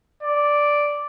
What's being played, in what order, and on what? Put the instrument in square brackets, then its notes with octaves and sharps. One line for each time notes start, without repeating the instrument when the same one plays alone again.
[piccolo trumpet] D5